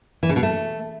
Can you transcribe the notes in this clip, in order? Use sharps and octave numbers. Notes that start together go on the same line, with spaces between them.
E3
C#3
B2
A3